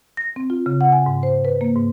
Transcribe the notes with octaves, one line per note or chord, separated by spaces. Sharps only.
A#6
C4
F4
C#3
F#5
G#5
G#2
C5
B4
A#3
G#2